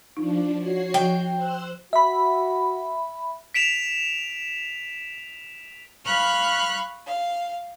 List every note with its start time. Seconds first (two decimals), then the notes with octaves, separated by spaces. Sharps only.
0.17 F3 D4 D#4
0.58 F#4 C#5 C7
0.94 F3 G5
1.35 C5 E6 F#6
1.93 F#4 E5 B5
3.54 B6 D7 E7 F7
6.04 F5 B5 C#6 F6 F#6
7.05 F5